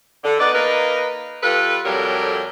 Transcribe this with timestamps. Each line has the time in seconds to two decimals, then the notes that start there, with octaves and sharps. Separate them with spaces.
0.24 D3
0.40 B3 D#4 B4 D5
0.54 A#3 D#4 A#4 B4
1.43 G3 F4 A4 B4
1.85 F2 A2 F#3 G3 A#4